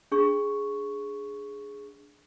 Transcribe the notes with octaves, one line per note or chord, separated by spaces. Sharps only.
D4 G#4 C#6